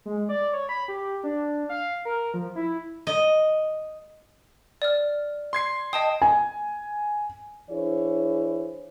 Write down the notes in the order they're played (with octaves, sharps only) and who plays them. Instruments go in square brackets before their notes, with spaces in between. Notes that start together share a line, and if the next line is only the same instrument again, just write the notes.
[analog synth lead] G#3
D5
C#5
B5
G4
D4
F5
A#4
F3
E4
[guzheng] D#5
[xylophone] D5 F6
[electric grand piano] C6 G#6 C7
[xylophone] D#5 A5 D#6 [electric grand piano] G5
[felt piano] G#5
[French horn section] E3 D4 E4 G#4 C5 C#5